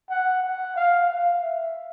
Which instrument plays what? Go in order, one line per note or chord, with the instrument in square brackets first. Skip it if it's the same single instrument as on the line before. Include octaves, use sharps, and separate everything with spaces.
[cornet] F#5
F#5
F5
F5
E5